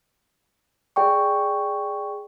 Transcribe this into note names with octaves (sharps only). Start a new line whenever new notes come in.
G#4 D5 G5 C#6